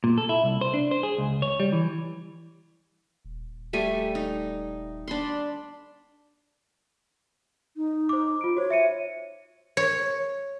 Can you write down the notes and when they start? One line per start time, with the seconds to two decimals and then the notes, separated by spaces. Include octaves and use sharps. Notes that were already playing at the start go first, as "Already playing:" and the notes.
0.04 A#2
0.18 A4
0.29 E4
0.43 C2
0.61 C5
0.74 D4
0.91 C5
1.03 G#4
1.18 C#2
1.42 C#5
1.60 G3
1.72 E3
3.25 D#1
3.73 G3 A3 G#5
4.15 D#4
5.08 D4 B5 C6
7.77 D#4
8.09 C5 D6
8.41 F4 D7
8.57 F#4 C5 C#5
8.70 E5 C#7 D#7
9.77 C#5